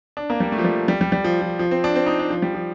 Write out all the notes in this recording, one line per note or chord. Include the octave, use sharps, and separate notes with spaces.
D4
A#3
G3
A3
F3
G3
G3
G3
G3
F3
F3
F3
C4
D4
C4
D#4
D4
F3
G3
F3